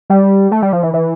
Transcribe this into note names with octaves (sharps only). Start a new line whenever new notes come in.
G3
A3
G3
F3
E3
E3